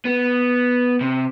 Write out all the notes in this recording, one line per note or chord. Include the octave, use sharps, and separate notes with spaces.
B3
C3